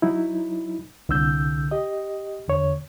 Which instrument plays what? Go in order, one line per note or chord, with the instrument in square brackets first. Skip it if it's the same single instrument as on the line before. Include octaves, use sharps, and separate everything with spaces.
[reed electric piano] F#3 D#4 E4
C2 D3 E6 G6
G4 D#5
E2 D3 C#5